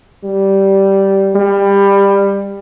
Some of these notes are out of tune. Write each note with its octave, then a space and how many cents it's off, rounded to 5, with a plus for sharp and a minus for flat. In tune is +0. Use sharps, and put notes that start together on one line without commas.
G3 -10
G3 +20